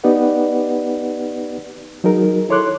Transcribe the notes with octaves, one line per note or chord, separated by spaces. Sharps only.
B3 D#4 G4 B4 D5 F#5
F#3 D#4 G#4 A#4
E4 A4 C#5 C6 D6 F#6